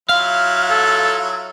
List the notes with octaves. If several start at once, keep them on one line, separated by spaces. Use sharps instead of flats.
F#3 E4 F4 F5
A4